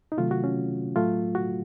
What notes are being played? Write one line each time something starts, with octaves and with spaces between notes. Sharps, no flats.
D#4
C3 D#3 F#3 A3 F4
F#4
C#4
A2 F#3 A3 F4
F#4